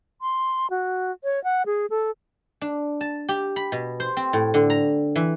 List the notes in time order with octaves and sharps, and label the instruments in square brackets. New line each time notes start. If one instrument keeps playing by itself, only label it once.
[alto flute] C6
F#4
C#5
F#5
G#4
A4
[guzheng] D4
A5
G4
B5
B2
C5
C4
A2
D3
A#5
E3